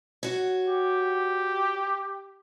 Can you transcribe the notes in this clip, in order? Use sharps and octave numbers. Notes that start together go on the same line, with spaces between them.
F#4 C#5
G4